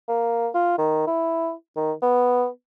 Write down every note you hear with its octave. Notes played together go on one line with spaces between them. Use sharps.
A#3
F4
D#3
E4
D#3
B3